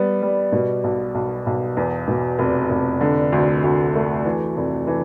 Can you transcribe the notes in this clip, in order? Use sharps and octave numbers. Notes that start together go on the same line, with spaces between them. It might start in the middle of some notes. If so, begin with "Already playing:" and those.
Already playing: G3 B3
G3
B2
B1
B1
B1
E2
B2
F1
F1
D3
D2
D2
A3
E3
F1
E3